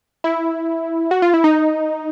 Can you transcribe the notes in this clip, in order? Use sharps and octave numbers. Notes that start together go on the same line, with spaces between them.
E4
F#4
F4
E4
D#4